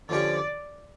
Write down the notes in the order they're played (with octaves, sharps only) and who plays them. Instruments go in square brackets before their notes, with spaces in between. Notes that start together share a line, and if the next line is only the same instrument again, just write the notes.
[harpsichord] D3 F3 C#4 G4 C#5 [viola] D5